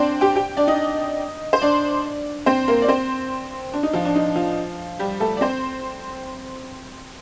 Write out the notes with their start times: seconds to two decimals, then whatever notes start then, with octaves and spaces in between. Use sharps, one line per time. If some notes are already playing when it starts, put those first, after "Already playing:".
Already playing: C4 D4 C5 D5 G5
0.21 G4 G5
0.36 G4 G5
0.57 D4 D5
0.67 D#4 D#5
1.53 C5
1.62 D4 D5
2.46 C4 C5
2.68 A#3 A#4
2.82 D5
2.88 C4 C5
3.73 D4
3.83 D#4
3.93 F3 F4
4.05 D4
4.15 D#4
4.36 F3 F4
4.99 G3 G4
5.20 A3 A4
5.37 D5
5.41 C4 C5